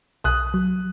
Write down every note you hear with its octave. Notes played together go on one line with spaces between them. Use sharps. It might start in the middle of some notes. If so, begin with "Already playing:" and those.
B1 D#6 F#6
F#3